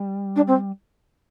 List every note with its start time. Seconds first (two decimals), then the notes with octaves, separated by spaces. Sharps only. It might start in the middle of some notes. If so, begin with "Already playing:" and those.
Already playing: G3
0.36 D4
0.47 C4